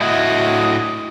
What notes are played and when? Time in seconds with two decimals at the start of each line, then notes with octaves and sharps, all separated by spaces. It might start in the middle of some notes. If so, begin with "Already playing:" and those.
0.01 A2 E4 F#4 D#5